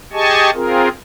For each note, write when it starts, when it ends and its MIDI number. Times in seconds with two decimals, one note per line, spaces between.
0.13 0.50 67
0.13 0.50 68
0.13 0.50 75
0.13 0.50 80
0.13 0.50 81
0.13 0.50 85
0.54 0.89 60
0.54 0.89 65
0.54 0.89 68
0.54 0.89 70